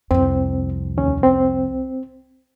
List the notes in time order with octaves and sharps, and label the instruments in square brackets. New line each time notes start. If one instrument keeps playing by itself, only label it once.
[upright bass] C2 F2 [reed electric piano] C4
[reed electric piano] D#2 C#4
C4